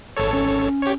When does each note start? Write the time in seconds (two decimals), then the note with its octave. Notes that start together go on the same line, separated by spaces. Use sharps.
0.17 G#1 A4 C#5 A5
0.33 C#4
0.82 G4 C#5